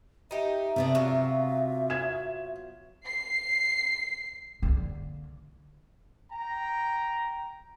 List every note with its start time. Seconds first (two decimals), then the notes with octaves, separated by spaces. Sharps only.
0.31 D#4 G4 E5
0.76 C3 A3 B3 D4
0.95 F#3 B3 F4
1.90 G#6 E7
3.06 C7
4.62 D3 A#3
6.32 G5 A#5